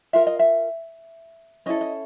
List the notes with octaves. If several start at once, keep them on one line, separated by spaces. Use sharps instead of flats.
F4 A#4 E5
D#5
E5
C#4 E4 A4 D#5
D#5